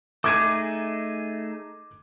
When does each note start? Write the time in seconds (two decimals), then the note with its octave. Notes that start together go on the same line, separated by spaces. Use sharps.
0.24 A3 D#4 G#4 D6 G#6 D#7